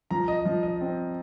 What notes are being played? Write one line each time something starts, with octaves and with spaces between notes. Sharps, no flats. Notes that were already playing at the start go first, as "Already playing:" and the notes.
F3 A#5
D#5
F3
D#5
C4